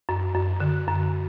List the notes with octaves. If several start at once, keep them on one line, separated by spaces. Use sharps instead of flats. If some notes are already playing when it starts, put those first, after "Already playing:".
F#2
F#2
D3
F#2